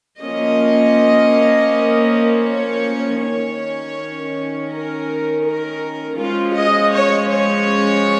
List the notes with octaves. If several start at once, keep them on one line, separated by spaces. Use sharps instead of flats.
F3 A#3 C#4 D#5
C#5
D#3 C#4 C#5
A#4
A#4
F3 G#3 C#4 F4
D#5
C#5
C#5